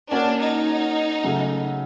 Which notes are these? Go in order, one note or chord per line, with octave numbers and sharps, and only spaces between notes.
A#3 C#4 D4 F#4 A#4 C#5
D#4
C#3 F#3 A3